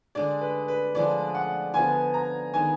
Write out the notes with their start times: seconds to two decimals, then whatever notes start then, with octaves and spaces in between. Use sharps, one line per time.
0.15 D3 G#3 D4 D5
0.41 B4
0.68 B4
0.95 D3 F3 G#3 D5
1.35 F#5
1.74 D3 F3 B3 F4 G#5
2.14 A#5
2.54 D#3 G#3 B3 D4 G#5